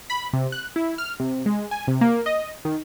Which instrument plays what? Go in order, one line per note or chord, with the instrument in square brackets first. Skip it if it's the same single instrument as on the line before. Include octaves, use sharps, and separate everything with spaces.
[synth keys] B5
C3
F#6
E4
F6
C3
G#3
G#5
C3
A#3
D#5
D#3